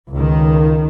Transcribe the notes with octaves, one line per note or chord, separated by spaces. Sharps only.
C#2 D#3